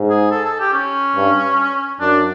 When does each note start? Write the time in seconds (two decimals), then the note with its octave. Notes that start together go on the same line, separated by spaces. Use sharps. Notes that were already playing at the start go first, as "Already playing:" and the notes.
Already playing: G#2
0.10 G#4
0.31 A4
0.45 A4
0.59 G4
0.74 C#4
1.16 G2
2.01 F#2 D4